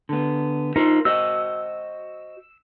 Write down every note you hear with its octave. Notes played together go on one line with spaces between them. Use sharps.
D3 B3
D#4 F4 A#4 C5
F#4 C5 D#5 E6